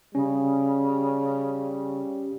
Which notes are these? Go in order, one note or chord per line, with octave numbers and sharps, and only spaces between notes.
C#3 G3 C#4